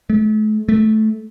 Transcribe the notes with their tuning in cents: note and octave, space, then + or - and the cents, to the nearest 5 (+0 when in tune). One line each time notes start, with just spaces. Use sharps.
A3 -40
A3 -15